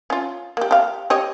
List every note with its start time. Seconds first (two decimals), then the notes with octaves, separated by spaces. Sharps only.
0.10 C#4 F4
0.57 A#3 G4
0.71 G4 F5
1.10 G4 C#5 D#5